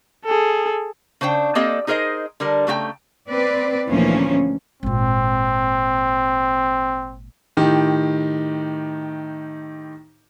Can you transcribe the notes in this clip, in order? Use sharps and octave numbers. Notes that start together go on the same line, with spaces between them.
G#4 A4
C#3 D4 C5 G5
A#3 C4 G4 A4 D5 D#5
D#4 G#4 A#4 C5 D#5
D3 G3 A#4
C#3 A3 F#4 G5 A#5
C4 B4 D5
D2 A#2 E3 F3 A#3 C#4
G#1 A#2 C4
A2 D#3 G4